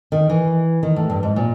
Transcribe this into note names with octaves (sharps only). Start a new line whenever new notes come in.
D#3
E3
D#3
A2
G2
G#2
A#2